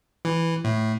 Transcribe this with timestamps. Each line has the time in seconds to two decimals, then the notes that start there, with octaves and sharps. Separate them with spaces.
0.25 E3
0.64 A2